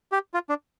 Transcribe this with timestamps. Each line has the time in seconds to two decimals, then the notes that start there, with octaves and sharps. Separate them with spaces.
0.12 G4
0.34 F4
0.49 D4